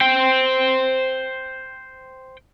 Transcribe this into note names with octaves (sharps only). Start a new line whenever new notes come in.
C5 G5